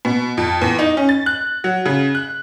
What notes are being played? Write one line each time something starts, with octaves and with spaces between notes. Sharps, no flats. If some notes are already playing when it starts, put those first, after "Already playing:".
B2
F2
E2
D#4
C#4
A6
F#6
F#3
C#3
F#6